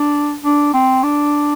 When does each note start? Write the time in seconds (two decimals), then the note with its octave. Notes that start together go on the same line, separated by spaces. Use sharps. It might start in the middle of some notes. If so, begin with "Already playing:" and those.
Already playing: D4
0.44 D4
0.73 C4
1.03 D4